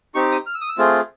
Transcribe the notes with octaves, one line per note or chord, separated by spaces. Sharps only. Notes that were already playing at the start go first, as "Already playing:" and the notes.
C4 D#4 G4 C#6
D#6
F6
E6
D#6
E6
A3 C4 F4 G#4